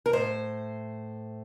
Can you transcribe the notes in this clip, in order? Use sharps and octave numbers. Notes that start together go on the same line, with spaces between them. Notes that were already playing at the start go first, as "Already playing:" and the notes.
A#4
A2 C5